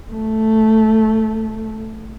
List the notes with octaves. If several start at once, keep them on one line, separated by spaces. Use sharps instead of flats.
A3